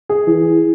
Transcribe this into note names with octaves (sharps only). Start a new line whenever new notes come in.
G#4
E3